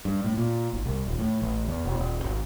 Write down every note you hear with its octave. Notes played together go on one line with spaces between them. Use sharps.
G2
A2
A#2
G#1
C2
D#1
A2
A1
E2
E1
D#1
G#1